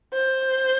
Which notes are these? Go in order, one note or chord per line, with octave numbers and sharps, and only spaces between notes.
C5